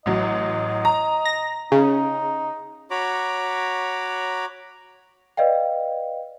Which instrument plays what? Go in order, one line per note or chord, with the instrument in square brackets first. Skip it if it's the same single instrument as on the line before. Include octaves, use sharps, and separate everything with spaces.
[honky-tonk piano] A1 F#3 [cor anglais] D#5
[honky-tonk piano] A#5
[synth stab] A#6
[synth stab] C#3 [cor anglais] D#4
[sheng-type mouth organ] F#4 C#5 A#5 B5 D6
[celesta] B4 D5 D#5 F5 G5